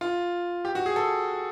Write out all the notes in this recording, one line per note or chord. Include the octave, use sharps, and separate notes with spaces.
F4
G4
F#4
G#4
A4